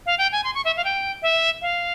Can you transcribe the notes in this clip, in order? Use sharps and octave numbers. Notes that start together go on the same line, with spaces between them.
F5
G5
G#5
C6
C#6
E5
F5
G5
E5
F5